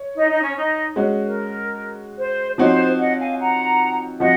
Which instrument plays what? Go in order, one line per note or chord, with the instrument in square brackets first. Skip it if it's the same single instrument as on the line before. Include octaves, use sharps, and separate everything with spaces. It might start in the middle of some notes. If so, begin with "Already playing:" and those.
Already playing: [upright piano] C#5
[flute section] D#4
D#4
C#4
D#4
[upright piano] G#3 C#4 F#4
[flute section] A#4
C5
[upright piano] F3 C4 D#4 F#4 C#5 [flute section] C5
[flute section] D#5 F#5
F5 G#5
F#5 A#5
[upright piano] F3 C4 F#4 [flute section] D#5 F#5